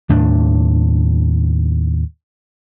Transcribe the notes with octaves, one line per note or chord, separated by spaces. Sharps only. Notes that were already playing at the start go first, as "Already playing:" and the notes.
D#2 A2 D4